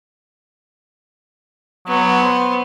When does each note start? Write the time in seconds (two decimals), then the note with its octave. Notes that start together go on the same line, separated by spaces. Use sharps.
1.88 F#3 B3
2.22 C5